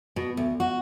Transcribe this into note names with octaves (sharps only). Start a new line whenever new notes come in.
B2
D2
F#4